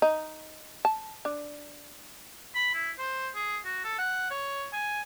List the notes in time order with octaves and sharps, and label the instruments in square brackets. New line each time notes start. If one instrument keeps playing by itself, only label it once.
[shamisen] D#4
A5
D4
[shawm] B5
E4
C5
G#4
F#4
A4
F#5
C#5
G#5